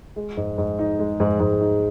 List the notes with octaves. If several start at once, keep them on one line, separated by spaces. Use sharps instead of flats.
G#3
G#2
G#2
D#4
G#3
G#2
G#2
D#4